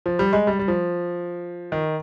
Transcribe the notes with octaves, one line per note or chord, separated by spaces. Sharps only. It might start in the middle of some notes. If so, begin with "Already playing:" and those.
F3
G3
G#3
G3
G3
F3
D#3